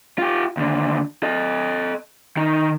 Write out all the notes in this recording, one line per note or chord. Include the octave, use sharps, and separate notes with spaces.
F4 G4
D#2 D3
A4 D#5
D#3 D#4